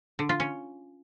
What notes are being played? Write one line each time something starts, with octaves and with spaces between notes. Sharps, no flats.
D3
F4
C#4